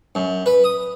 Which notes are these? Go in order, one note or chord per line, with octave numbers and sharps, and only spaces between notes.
F#2
B4
D#6